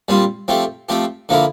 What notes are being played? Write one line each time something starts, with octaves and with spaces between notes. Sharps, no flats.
A#2 G3 C4 F4
F3 A3 C4 G4
F3 A3 C4 G4
D3 F3 A#3 E4 A#4